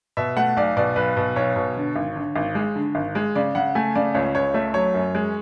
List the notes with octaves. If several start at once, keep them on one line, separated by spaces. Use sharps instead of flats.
B2 E5
A3 F#5
B1 D5
B2 D5
B1 B4
B2
B1 C#5
B2
D3
G#1
D3
G#1
G#3
D3
G#1
G#3
C#3 D5
C#3 F#5
A3 G#5
C#3 D5
C#2 C#5
C#2 C#5
A3 E5
F#3 C#5
F#2
G#3